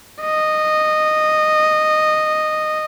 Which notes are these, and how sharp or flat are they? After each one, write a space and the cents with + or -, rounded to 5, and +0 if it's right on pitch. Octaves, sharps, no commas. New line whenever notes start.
D#5 -10